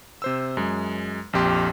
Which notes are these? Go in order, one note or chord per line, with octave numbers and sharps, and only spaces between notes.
C3 C5 E6
F#2 G#3
A#1 F2 G4 C6